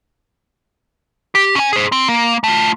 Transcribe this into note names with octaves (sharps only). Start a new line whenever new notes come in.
G4
C#4 G#5
G#4 C5
C4
A#3
A3 F4